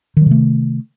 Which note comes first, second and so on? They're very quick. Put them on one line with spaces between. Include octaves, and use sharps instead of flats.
D#3 F#3 C3 A3